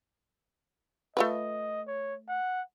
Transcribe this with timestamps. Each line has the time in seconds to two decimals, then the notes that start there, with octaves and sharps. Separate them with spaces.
1.17 A3 F4 B4 D#5
1.87 C#5
2.28 F#5